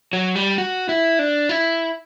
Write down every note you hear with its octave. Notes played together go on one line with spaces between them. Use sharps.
F#3
G3
F#4
E4
D4
E4